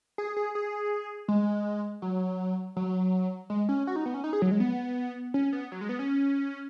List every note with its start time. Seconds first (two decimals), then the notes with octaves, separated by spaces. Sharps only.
0.18 G#4
0.37 G#4
0.55 G#4
1.28 G#3
2.02 F#3
2.76 F#3
3.50 G#3
3.69 C#4
3.87 F#4
3.96 D#4
4.06 B3
4.14 C#4
4.24 D#4
4.33 G#4
4.42 F#3
4.51 G#3
4.60 B3
5.34 C#4
5.53 B3
5.72 F#3
5.81 G#3
5.89 B3
5.99 C#4